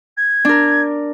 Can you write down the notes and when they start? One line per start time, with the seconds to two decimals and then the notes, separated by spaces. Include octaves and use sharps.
0.17 G#6
0.45 D4 A#4